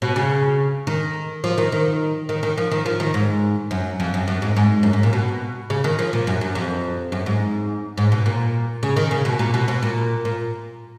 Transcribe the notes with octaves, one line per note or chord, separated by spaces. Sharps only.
B2
C#3
D#3
F3
D#3
D#3
D#3
D#3
F3
D#3
F3
D#3
G#2
F#2
F2
F#2
F#2
G#2
G#2
F#2
G#2
A#2
B2
C#3
D#3
F3
A#2
F#2
F#2
F2
F#2
G#2
G#2
B2
A#2
C#3
D#3
C#3
B2
A#2
B2
B2
A#2
A#2